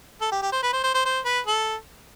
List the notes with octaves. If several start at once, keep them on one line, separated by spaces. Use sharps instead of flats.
A4
G4
G4
C5
B4
C5
C5
C5
C5
B4
A4